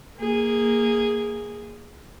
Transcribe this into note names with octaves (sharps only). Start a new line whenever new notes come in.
A#3 G#4